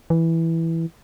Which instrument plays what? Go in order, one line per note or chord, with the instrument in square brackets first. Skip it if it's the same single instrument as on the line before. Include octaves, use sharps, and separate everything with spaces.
[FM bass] E3